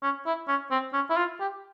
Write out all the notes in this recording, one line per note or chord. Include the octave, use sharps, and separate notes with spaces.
C#4
E4
C#4
C4
C#4
E4
F4
G4